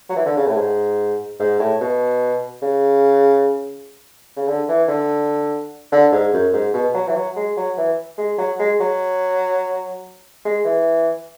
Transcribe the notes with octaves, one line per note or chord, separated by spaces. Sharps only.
F#3
E3
D3
C#3
A2
G#2
G#2
A2
B2
C#3
C#3
D3
E3
D3
D3
G#2
F#2
G#2
B2
F#3
E3
F#3
G#3
F#3
E3
G#3
F#3
G#3
F#3
G#3
E3